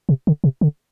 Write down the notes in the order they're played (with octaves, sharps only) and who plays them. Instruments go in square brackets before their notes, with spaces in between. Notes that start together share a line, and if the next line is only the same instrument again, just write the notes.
[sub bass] C3
D3
C3
D3